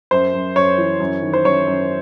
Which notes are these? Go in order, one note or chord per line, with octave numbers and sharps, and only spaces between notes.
F#2 C5
F#2
F#2 C#5
E3
F#2
D#3
C5
F#2 C#5
F#2